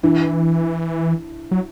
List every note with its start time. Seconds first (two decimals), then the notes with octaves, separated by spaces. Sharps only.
0.03 E3 D4 E4
1.51 F#3